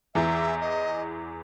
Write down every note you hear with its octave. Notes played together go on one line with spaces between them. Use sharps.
E2 E3 E5
D#5